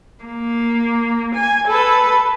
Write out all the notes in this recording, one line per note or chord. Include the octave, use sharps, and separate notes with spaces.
A#3
G#5
A4 B4